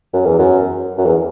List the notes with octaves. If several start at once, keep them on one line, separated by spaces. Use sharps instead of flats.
F#2
E2
F#2
F#2
E2